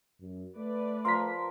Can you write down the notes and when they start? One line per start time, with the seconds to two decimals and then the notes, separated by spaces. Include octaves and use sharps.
0.20 F#2
0.57 A3 B4 D5
1.05 F3 A#4 C6 B6